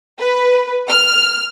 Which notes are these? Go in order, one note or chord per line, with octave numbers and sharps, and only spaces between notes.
B4
F6